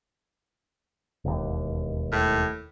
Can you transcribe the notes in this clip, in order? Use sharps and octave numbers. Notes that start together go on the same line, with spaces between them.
E1 D#2
A2